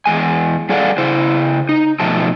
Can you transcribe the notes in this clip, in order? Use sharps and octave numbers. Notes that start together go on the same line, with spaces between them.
E2 G#3 G#5
G3 G#4 A4 D5 F5 F#5
C#3 E4 C5
D#4
B2 F3 A3 D#4 A5